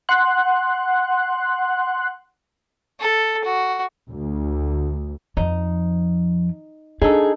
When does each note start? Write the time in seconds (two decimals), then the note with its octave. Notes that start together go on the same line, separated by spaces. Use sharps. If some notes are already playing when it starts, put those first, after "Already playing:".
0.09 F#5 C6 F#6
3.00 A4
3.44 F#4
4.10 D2
5.37 F2 F3 D#4
7.02 D4 D#4 G#4 A4